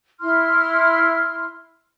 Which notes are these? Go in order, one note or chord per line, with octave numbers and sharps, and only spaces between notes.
E4 C6 F6